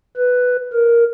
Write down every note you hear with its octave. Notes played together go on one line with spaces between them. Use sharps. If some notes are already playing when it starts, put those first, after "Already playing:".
B4
A#4